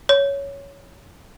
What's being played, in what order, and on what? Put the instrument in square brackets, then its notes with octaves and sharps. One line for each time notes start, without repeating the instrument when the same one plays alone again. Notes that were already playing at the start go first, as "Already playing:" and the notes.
[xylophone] C#5